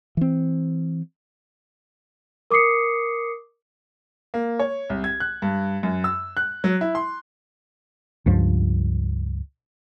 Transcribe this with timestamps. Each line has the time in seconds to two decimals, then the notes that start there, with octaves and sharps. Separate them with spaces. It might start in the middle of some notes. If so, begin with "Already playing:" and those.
0.17 E3 C4
2.51 A#4 D6 D#6 C7 C#7
4.34 A#3
4.59 C#5
4.90 C2
5.04 G#6
5.20 F#6
5.42 G2
5.83 F#2
6.04 E6
6.37 F#6
6.64 F#3
6.81 E4
6.95 C6
8.26 C#2 G2 F3